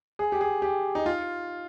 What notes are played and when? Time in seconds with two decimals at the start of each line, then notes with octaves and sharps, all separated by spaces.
0.19 G#4
0.32 G4
0.41 G#4
0.62 G4
0.95 D#4
1.06 F4